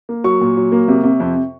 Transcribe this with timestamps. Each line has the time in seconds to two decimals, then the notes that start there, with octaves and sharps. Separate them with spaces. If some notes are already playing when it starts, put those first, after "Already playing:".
0.09 A#3
0.24 F#3 C#6
0.41 A#2
0.57 F#3
0.72 A#3
0.88 C3
1.04 C3
1.20 F2